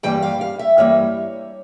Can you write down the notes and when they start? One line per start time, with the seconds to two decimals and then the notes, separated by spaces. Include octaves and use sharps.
0.03 G2 E3 G3 A#3 G5
0.22 F5
0.41 F5
0.59 E5
0.78 G2 E3 G3 A#3 C#5